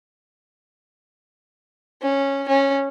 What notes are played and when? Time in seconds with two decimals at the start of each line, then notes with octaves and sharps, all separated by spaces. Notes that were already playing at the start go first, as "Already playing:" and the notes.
2.02 C#4
2.48 C#4